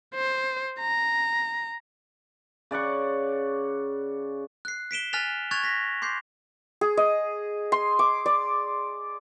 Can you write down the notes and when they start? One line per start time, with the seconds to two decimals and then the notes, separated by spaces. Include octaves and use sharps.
0.15 C5
0.79 A#5
2.71 C#3 D5 F#5 C#6
4.65 F#6 C7
4.91 B6 D7 E7 G7
5.13 G#5 F6 F#6 A6 B6 F7
5.51 C#6 F#6 G#6 A6 F7
5.64 A#6 B6
6.02 C6 D6 G6 C7
6.81 G#4
6.97 D#5
7.72 C6
7.99 D6
8.26 D5